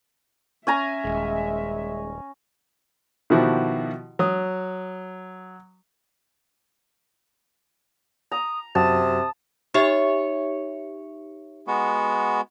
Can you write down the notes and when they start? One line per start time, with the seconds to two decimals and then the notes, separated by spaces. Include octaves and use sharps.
0.67 C#4 E5 G#5 A#5
1.05 D#1 G#3
3.30 B2 D#3 F3 E4 F#4 G4
4.19 F#3 D#6
8.32 A#5 D#6
8.75 F#2 C3 F#4 A5 D#6
9.74 D#4 G4 C#5 E5
11.67 G#3 B3 F#4